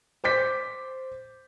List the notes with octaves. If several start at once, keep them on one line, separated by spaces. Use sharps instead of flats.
C5 D6 G6 B6